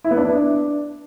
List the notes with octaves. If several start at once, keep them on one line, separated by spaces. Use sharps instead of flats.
E4
B3
D4